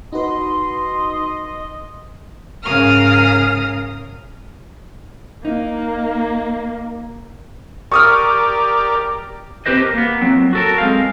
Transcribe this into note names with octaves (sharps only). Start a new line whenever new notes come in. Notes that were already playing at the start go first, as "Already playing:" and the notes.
D#4 F#4 B4 D#5 C6
G#2 C#3 A#4 F5 D#6 F6
A#3 D#4
G4 A#4 D5 C#6 D#6 F6
C4 G4 B4 C5 D#5
G4 A#4
A#3 B3
F#3 C4
F#4 A4 A#4
G#3 C4 F5